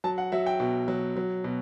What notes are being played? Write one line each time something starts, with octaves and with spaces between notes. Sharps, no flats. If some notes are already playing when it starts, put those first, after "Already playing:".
F#3 A5
F#5
F#3 E5
G5
B2
F#3
F#3
B2